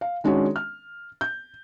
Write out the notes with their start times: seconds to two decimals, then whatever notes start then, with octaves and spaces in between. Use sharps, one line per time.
0.01 F5
0.24 D#3 G#3 C#4 D4 F#4
0.56 F6
1.21 G6